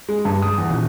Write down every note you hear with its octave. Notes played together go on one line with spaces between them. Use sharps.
G#3
G2
D#6
E2
D#1